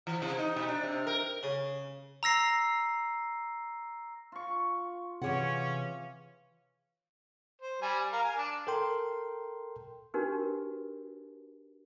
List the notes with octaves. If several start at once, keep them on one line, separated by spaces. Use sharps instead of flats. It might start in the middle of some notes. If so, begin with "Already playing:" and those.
E3
C3
D#4
B2
D4
C3
A#4
C#3
A#5 E6 A#6 C7
F4 C#6
C3 E3 C#4 G#4 C#5 F#5 D6
C5
G3 G#5
A#4 F5
G#5
D4
A4 A#4 G5 C6
D4 D#4 F#4 G4 A#4 B4